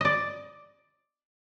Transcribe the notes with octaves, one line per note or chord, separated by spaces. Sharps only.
D5 D#5